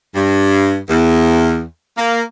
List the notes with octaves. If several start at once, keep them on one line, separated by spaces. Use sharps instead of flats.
G2
E2
A#3